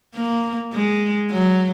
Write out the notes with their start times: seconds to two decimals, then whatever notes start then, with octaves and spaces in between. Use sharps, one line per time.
0.15 A#3
0.73 G#3
1.30 F#3